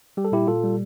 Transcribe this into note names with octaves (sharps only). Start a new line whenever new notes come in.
G3 G4
A4
A#2 E4 G4
A#2 F4 A4
G3